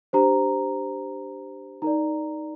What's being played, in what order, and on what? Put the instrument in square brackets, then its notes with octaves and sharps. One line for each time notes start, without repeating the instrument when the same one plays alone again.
[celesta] D4 G4 C5 A#5
D#4 A#4 D5 A#5